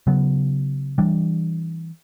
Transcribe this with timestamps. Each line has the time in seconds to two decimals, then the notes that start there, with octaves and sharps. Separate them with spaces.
0.07 C#3 F#3 B3
0.98 E3 G3 D4